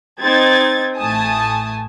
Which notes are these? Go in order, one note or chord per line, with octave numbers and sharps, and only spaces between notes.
C4 D#4 G#6 A6
A1 A3 G#5 A5 D#6